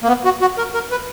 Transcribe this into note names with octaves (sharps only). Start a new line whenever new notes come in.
A#3
B3
F#4
F#4
A#4
A#4
B4